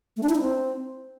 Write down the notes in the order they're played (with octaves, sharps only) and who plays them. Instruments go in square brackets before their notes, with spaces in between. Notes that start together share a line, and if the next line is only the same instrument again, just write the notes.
[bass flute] A3
D4
E4
D#4
C4